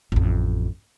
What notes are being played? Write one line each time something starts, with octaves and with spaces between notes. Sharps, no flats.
A1 F2